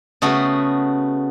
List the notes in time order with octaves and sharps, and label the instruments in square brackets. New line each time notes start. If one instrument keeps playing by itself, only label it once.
[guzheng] C#3 A3 B3 F#4